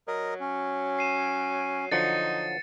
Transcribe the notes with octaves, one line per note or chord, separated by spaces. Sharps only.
F#3 A#4 D#5
C#4
C7 D#7 E7
D3 F3 F#3 D#4 A6 C#7